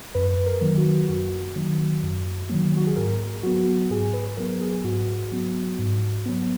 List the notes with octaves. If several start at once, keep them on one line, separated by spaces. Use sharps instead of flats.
F#2 B4
A#4
D#3 F#3 A#3
F#4
F#2 F#4
D#3 F#3 A#3
F#2
D#3 F#3 A#3
F#4
G#4
G#2 A#4
F#3 B3 F#4
G#2 G#4
B4
F#3 B3 A#4
G#4
G#2 F#4
F#3 B3
G#2
F#3 B3